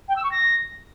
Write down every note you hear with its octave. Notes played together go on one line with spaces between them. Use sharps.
G5
E6
C#6
A#6